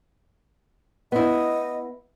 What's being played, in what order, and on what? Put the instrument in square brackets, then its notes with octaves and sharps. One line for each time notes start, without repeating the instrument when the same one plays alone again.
[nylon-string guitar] B3 E4 [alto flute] D#5